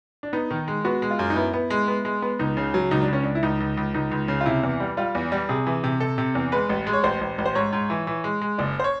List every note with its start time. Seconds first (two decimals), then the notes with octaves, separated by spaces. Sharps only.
0.23 D4
0.33 B3 D#4
0.51 D#3
0.68 G#3
0.85 B3 F#4
1.02 G#3
1.11 F4
1.19 F#2
1.30 D#4
1.36 B3 E4
1.54 B3
1.70 G#3
1.88 B3
2.05 G#3
2.22 B3
2.39 C#2 D#4
2.57 C#3
2.74 F#3
2.91 C#2 D#4
3.02 D4
3.08 C#2
3.13 C#4
3.23 C#2 D4
3.35 E4
3.43 C#2 D#4
3.60 C#2
3.77 C#2
3.94 C#2 D#4
4.11 C#2
4.28 C#3
4.41 F4
4.46 C3 E4
4.63 E2
4.80 G3
4.97 G3 F4
5.15 E2
5.32 G3
5.49 C3 G#4
5.66 E3
5.84 C3
6.00 C3 A4
6.18 C3
6.35 E2
6.52 G#3 B4
6.69 A1
6.87 G#3
6.93 C#5
7.04 A1 C5
7.21 A1
7.38 A1
7.46 C5
7.55 G#2 C#5
7.73 G#2
7.90 E3
8.07 E3
8.24 G#3
8.41 G#3
8.58 F#1 D5
8.80 C5
8.84 C#5